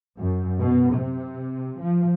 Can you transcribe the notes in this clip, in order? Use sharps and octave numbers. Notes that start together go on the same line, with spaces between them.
F#2
B2
C3
F3